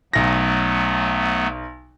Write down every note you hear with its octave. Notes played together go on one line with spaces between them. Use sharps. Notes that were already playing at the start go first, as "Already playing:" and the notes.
B1 F#3 A3 B3 A#6